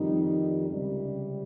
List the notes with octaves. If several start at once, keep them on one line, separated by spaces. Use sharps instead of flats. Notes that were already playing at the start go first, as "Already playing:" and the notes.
Already playing: F2 D#3 G3 D#4
C#2 C3 G3